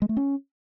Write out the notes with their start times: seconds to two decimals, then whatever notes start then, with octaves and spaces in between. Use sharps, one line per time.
0.02 G#3
0.09 A3
0.17 C#4